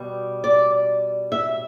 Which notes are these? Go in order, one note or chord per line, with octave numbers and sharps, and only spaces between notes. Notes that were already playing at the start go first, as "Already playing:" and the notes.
Already playing: B2 G3
D5
E5